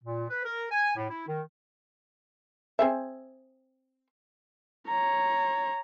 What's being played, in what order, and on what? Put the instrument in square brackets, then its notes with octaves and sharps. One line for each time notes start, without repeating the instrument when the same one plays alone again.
[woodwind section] A#2
B4
A#4
G#5
A2
E4
D#3
[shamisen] C4 G#4 E5
[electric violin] C#5 A#5